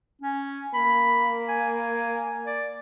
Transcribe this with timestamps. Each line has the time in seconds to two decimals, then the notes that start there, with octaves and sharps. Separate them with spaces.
0.22 C#4
0.74 A#3 B5
1.48 G#5
2.46 D5